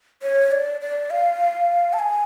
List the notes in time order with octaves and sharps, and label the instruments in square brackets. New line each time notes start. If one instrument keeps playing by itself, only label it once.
[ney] C#5
D5
D5
F5
A5
G#5